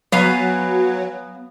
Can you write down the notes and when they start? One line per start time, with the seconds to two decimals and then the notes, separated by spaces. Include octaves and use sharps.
0.12 F#3 B3 F5 G#5